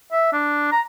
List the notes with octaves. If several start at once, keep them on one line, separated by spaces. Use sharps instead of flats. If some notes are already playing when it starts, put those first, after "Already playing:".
E5
D4
A#5